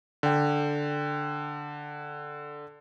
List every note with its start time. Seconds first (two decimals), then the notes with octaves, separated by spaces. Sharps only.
0.23 D3 G5